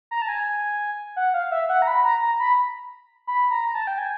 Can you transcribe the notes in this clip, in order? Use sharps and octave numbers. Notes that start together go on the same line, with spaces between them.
A#5
A5
G#5
F#5
F5
E5
F#5
A#5
B5
A#5
A#5
B5
B5
A#5
A5
G5
G#5